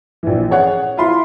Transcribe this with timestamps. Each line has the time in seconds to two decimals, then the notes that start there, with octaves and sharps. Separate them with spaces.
0.23 A#1 E3
0.51 G#4 C#5 F#5
0.97 E4 F4 B5 C6